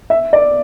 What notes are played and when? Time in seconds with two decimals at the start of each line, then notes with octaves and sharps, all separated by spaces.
0.10 E5
0.33 D5